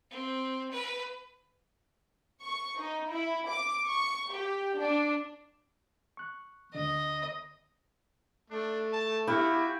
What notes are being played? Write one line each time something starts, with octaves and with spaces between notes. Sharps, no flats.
C4
B4
C#6
D#4
E4
D6
C#6
G4
D4
C#6 F#6
D2 D3 D#5
A3 D4
A5
E4 F#4 G4 F5 B5